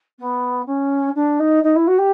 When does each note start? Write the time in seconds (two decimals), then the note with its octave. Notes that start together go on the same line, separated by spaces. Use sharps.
0.19 B3
0.66 C#4
1.15 D4
1.39 D#4
1.63 D#4
1.75 E4
1.87 F#4
1.98 G4